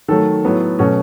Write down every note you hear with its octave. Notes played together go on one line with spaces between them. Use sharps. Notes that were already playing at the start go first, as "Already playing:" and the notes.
D#3 F#3 A3 A4
A2 F#3 B3
B2 F#3 A3 C#4 C#5